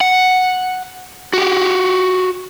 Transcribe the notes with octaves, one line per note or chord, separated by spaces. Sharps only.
F#5
F#4 G4